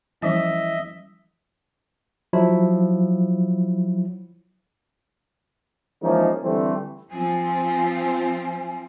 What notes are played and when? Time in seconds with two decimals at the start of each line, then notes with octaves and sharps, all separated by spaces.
0.22 E3 F3 G3 C#4 D#5 E5
2.33 F3 F#3 E4
6.02 E3 F3 G#3 A#3 C#4 D#4
6.42 D3 E3 G3 A3 C4
7.11 F3 C4 F4 G#5